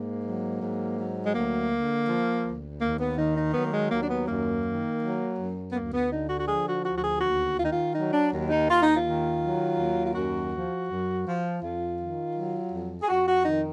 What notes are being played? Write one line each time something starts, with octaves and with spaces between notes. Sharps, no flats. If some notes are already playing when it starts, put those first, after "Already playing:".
Already playing: G#2 A#3
F#3
G#2
F#3
G#3
D2 A#3
D3
F3
D2
D#2 A#3
B3
D#3 D#4
D#4
F#3 B3
A#3
G#3
D#2 A#3
D4
B3
F#2 A#3
D#3
F#3
F#2
B3
D2 A#3
B3
D3 D#4
F#4
F#4
F3 G#4
F#4
D2 F#4
F#4
G#4
D#2 F#4
D#3 F4
D#4
F4
F#3 D#4
D4
D#2
D#4
D#2 F4
D#4
F4
D#3
F#3
D#2
F4
F#2 F#4
F3
F#2
F3
F2 F4
D#3
F#3
F2
G#4
F2 F#4
F#4
D#3 D#4